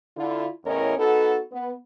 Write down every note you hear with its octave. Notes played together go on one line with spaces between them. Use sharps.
D3 E4 F4
E2 A2 C#4 A#4 C#5 D#5
B3 D#4 F#4 A4
B3